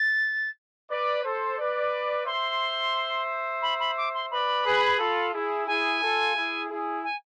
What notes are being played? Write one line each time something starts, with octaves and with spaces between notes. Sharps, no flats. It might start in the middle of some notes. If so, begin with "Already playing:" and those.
Already playing: A6
B4 D5
A4 C5
B4 D5
C5 E5 C6
B5
B5
D6
C6
B4 D5 B5
G#4 B4
F4 A4
E4 G#4
E4 G#4 G#5
F4 A4
E4 G#4
E4 G#4
G#5